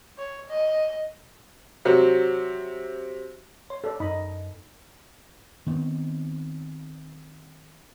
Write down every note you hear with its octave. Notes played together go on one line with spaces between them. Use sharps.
C#5
D#5
C3 F#3
C#5 C6
A4 D5
F#2 D#4 D#5 B5
D#3 B3 C4